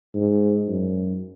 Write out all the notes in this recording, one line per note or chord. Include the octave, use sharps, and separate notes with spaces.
G#2
F#2